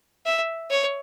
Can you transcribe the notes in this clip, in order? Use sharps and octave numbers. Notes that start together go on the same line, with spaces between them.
E5
C#5